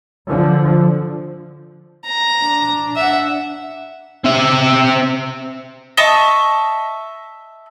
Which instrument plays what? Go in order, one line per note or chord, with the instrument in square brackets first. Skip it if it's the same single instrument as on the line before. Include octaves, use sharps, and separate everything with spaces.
[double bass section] D3 F3
[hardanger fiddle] A#5
[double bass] D4
[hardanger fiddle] E5 F#5
[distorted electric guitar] C4 E5
[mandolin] D#5 E5 A5 C#6